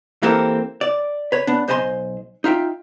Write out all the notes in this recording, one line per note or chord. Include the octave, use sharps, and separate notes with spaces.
E3 A#3 C4 G4 A4 A#4
D5
B4 C#5
B3 D4
B1 C5 D#5 G#5 A#5 C6
D#4 F4 E5 G5